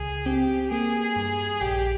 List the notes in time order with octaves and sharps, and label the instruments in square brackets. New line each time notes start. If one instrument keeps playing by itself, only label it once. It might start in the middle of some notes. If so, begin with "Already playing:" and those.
Already playing: [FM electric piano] C#2 [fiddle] G#4
[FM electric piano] C4 [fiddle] G4
[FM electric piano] A#3 [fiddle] G#4
[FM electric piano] G2
[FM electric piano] A#1 [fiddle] G4